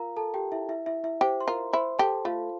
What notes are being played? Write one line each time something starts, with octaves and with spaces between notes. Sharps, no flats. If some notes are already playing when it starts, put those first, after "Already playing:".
Already playing: F4 A#4 F5 A#5
A4 A5
G4 G5
E4 E5
E4 E5
E4 E5
E4 E5
G4 C5
C6
F4 A#4 A#5
E4 C5 C6
G4 A4 A5
A3 F4 F5